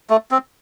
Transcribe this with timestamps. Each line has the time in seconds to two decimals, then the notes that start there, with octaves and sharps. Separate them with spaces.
0.10 A3
0.31 C4